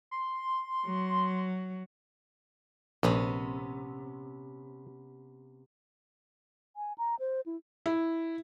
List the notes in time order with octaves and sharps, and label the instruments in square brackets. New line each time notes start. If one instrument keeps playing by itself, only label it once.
[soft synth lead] C6
[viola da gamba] F#3
[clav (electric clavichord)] A#1 [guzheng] C3 B3 C#4
[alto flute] G#5
A#5
C5
E4
[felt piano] E4